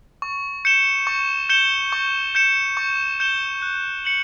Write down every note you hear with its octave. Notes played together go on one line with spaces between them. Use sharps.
C#6
G6 C#7 E7 G7
C#6
G6 C#7 E7 G7
C#6
G6 C#7 E7 G7
C#6
G6 C#7 E7 G7
F#6
C#7 F#7